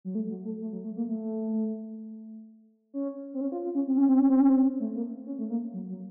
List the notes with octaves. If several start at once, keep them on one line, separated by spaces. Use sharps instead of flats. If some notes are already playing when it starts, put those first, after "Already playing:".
F#3
A3
F#3
A3
A3
F#3
A3
A#3
A3
C#4
C4
C#4
F4
F4
C#4
C4
C#4
C4
C#4
C4
C#4
C4
A3
A#3
C#4
A3
A#3
F#3
F#3